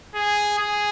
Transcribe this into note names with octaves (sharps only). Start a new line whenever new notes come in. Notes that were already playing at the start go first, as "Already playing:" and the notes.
G#4
G#4